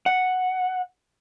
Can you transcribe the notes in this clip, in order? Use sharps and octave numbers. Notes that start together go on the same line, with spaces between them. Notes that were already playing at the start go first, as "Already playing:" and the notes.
F#5